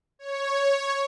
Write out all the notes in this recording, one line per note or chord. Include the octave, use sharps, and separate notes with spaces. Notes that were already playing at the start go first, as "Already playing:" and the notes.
C#5